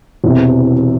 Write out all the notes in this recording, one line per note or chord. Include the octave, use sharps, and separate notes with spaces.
E1 E2 C3